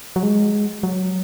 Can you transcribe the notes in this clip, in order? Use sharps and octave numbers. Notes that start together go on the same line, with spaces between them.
F#3
G#3
F#3